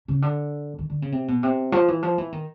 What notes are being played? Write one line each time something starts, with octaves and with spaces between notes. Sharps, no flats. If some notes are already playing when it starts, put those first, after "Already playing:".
C#3
D3
D#3
D3
C#3
C3
B2
C3
F3
E3
F3
E3
D#3